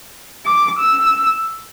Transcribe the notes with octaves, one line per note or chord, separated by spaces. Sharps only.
D6
E6